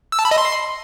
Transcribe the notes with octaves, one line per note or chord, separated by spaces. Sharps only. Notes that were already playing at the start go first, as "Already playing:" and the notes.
E6
A5
B5
D#5
C6